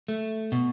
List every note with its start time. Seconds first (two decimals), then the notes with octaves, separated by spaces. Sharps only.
0.08 A3
0.52 B2